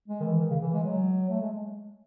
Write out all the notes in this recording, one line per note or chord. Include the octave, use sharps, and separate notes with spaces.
G#3
D#3
E3
D#3
C#3
E3
G#3
F#3
A3
G#3